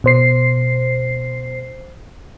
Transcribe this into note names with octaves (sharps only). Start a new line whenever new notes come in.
B2 C5 C7